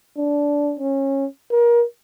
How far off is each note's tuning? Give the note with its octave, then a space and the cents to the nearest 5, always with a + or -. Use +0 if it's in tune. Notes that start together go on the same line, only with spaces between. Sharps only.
D4 -15
C#4 -20
A#4 +30